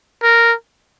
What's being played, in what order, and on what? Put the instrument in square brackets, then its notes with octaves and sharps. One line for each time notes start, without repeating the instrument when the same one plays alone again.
[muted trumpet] A#4